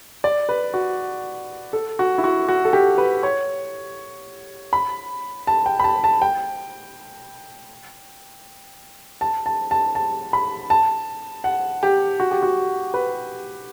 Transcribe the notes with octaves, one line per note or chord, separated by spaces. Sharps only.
D5
B4
F#4
A4
F#4
E4
F#4
F#4
A4
G4
B4
C#5
B5
A5
G5
B5
A5
A5
G5
A5
A5
A5
A5
B5
A5
F#5
G4
F#4
G4
F#4
B4